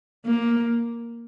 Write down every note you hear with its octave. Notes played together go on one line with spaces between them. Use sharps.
A#3